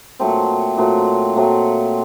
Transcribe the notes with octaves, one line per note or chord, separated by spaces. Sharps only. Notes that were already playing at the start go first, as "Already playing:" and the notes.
A#2 F#3 A3 C4
A#2 F#3 A3 C4
A#2 F#3 A3 C4